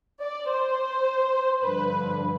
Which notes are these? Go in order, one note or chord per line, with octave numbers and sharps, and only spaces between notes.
D5
C5
G2 D3 F3 B4